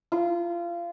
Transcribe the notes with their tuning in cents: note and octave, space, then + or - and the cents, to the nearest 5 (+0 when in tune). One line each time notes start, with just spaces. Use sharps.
F4 -25